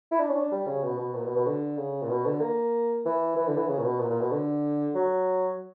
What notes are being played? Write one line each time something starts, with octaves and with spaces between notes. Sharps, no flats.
E4
D4
C#4
D4
G3
C#3
B2
B2
A#2
B2
B2
D3
C#3
A#2
B2
D3
A#3
E3
E3
D3
E3
C#3
A#2
B2
A#2
A#2
B2
D3
F#3